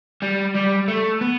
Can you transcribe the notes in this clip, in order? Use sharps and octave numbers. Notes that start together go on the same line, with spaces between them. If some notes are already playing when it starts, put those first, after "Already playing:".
G3
G3
A3
B3